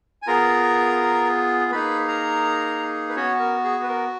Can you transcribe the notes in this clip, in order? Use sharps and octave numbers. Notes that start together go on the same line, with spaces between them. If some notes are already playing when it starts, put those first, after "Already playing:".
G#5
B3 F4 G#4 A#4 A#5
A#3 D#4 G#4 B4 B5
A#4 A#5
B4
B3 C#4 F#4 C#5
A#4
G#4
B4
A#4